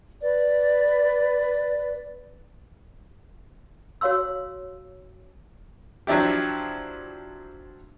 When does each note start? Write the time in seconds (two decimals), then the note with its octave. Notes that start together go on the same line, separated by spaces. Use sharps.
0.22 B4 D5
4.01 F#4 C#5 F5 C6 E6
6.07 F3 F#3 D4 E4 G4